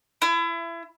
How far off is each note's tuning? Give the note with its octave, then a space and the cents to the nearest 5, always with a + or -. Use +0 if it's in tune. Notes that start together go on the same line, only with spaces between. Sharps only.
E4 +30